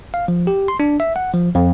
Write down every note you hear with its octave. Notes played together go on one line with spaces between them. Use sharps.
F5
F3
G4
C6
D4
E5
F#5
F3
F2